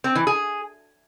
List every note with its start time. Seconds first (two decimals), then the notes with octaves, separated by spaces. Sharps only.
0.04 C4
0.16 E3
0.27 G#4